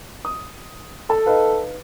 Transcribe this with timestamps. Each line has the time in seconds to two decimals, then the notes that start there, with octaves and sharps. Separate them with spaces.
0.25 D#6
1.10 A4 A5
1.26 D#4 B4 F5